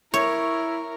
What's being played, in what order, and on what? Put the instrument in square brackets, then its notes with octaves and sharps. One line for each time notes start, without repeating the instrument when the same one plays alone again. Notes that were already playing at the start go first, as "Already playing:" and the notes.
[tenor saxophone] E4 [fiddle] A#4 [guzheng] C#5